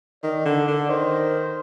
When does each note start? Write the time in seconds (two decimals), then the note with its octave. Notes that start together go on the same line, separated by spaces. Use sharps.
0.24 D#3 D5
0.45 D3
0.68 D3
0.89 D#3 C5